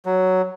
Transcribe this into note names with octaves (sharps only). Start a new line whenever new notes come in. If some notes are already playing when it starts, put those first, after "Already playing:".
F#3